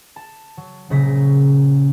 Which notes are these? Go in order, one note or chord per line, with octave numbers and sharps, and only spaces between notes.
A5
F#3
A#1 C#3 F#3 A#6 B6